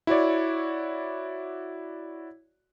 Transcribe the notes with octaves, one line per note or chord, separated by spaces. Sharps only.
E4 F#4 C#5 D5